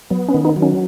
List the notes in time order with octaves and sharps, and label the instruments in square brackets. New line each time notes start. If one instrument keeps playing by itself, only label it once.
[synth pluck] F#3 [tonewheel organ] B3
[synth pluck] C#4
[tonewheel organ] D#3
[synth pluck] D#4
[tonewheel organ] F#3
[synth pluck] C#4